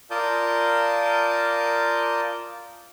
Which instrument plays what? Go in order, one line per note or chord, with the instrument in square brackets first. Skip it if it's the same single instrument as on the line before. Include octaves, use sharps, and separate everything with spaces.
[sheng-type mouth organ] F4 A#4 D5 A5 D#6 G6